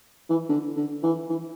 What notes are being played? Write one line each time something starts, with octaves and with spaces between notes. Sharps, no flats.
E3
D3
D3
E3
E3